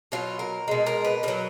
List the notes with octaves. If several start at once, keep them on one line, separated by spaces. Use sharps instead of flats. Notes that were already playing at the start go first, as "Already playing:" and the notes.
B2 F#3 F4
A#4
B2 G#3
A#4
B4
B2 F#3 A#4